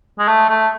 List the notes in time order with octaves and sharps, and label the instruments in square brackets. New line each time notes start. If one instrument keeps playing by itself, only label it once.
[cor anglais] G#3
A3
A3